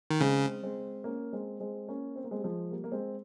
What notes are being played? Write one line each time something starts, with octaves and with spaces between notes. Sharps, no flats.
D#3
C#3 G#3 C4
G#3 C4
A#3 C#4
G#3 C4
G#3 C4
A#3 C#4
C4
A#3
G#3 C4
G3
F3 G#3
G3 A#3
A#3
G#3 C4